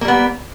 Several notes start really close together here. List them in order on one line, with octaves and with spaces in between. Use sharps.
A#3 G3 B3